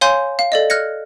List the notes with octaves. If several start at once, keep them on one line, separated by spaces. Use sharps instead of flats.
C#5 F5 G#5 C6 G6
F5
A4 D5 D#5
F6 F#6 G#6 A#6 C#7